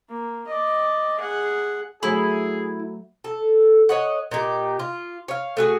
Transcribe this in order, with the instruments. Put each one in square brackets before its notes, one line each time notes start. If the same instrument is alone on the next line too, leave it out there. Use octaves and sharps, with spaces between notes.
[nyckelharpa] A#3
D5 D#5
G#4 F#5
[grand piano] F#3 A3 [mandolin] E4 [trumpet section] G#4
[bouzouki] A4
C#5 D#5 F#5
A#2 D#4 G4
F4
C#5 F5
A3 F#4 G#4